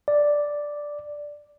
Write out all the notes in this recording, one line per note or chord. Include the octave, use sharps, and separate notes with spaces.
D5